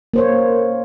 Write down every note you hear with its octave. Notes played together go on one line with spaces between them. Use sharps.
A#3 C5 C#5